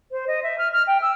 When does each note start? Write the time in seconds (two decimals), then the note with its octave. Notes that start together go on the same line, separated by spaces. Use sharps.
0.11 C5
0.28 D#5
0.43 E5
0.58 F6
0.73 F6
0.87 G5
1.02 E6